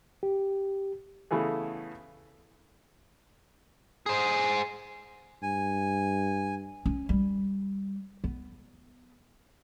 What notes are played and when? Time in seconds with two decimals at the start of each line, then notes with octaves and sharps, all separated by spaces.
0.23 G4
1.31 C#3 E3 A3 B3 G#4
4.06 G#4 C5
5.43 G2 G#5
6.86 C#4
7.09 G3
8.24 B3